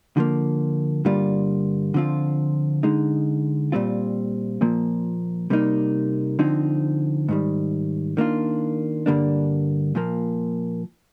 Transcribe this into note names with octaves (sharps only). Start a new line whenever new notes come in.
D3 F3 A#3
G2 D3 G3 A#3 F4
D3 F3 C4 F4
D3 G#3 D#4
A#2 G3 C4 F4
A#2 F3 A#3
C3 G3 A#3 D#4
D3 F3 C4 D#4
G#2 D#3 G3
D#3 A#3 D4 F4
G2 D3 G3 A#3 D4
A#2 F3 A#3